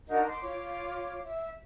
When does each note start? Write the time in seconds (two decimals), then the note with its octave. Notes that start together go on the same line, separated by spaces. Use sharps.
0.07 D4 D#4 F#4 A#4
0.28 C6 D6
0.42 F4 C#5 D6
1.24 E5